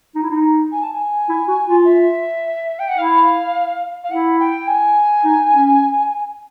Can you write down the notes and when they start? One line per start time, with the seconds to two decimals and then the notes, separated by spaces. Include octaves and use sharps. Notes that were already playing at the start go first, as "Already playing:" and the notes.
0.15 D#4
0.23 E4
0.30 D#4
0.72 G#5
0.83 A5
0.93 G#5
1.29 E4
1.48 F#4
1.67 F4
1.85 E5
2.79 G5
2.89 F#5
2.98 E4 F5
4.04 F5
4.11 E4 F#5
4.39 G5
4.68 G#5
5.24 D#4
5.53 C#4